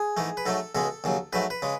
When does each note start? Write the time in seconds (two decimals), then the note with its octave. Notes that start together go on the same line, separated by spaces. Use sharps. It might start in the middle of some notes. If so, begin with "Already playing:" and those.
Already playing: G#4
0.17 G#2 E3 A3
0.37 B4
0.46 G#2 F#3 A3 A4
0.75 C#2 B2 G#3 A4
1.04 D#2 C#3 F#3
1.33 G#2 F#3 A3 B4
1.50 B4
1.62 C#3 G#3